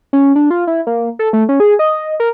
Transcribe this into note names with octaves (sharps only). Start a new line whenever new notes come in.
C#4
D4
F4
E4
A#3
A4
A3
C#4
G#4
D#5
A#4